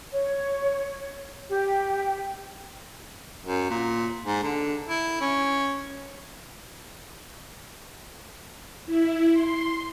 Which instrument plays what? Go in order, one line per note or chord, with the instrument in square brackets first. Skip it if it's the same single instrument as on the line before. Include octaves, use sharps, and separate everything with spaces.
[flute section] C#5
G4
[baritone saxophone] F#2
A#2
G#2
D3
E4
C#4
[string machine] E4
C6